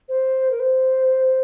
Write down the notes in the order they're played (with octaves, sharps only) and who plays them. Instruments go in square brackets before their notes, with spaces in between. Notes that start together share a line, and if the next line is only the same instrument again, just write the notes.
[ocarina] C5
A#4
C5